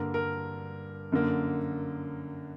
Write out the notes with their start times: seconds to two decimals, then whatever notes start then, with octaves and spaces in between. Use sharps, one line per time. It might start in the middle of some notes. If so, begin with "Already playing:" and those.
Already playing: G2 D3 A#3 A#4
0.14 A#4
1.12 F#2 D3 A#3